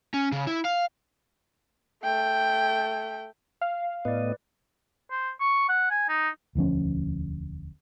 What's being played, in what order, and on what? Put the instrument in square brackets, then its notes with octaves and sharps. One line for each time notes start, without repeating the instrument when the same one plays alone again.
[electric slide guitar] C#4
C#3
E4
F5
[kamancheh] A3 G5
[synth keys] F5
[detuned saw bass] A2 [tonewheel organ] B3 D#5 [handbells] B4 D5
[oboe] C5
C#6
F#5
G#5
D#4
[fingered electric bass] E1 D2 F3 C#4